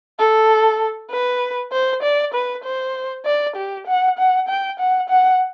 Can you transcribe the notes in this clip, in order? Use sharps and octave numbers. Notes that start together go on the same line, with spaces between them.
A4
B4
C5
D5
B4
C5
D5
G4
F#5
F#5
G5
F#5
F#5